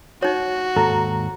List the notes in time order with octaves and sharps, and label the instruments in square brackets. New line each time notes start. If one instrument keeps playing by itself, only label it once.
[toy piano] D#4 C#5 [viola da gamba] F#4
[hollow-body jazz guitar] D#2 G#2 A4 [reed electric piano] A#5